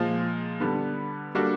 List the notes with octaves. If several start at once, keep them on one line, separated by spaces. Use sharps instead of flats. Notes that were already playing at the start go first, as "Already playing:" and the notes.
Already playing: A#2 F3 G#3
D3 G3 B3
G3 A#3 D4 F#4 A4